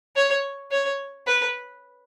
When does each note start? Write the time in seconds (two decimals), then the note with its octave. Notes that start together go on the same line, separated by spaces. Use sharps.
0.16 C#5
0.71 C#5
1.27 B4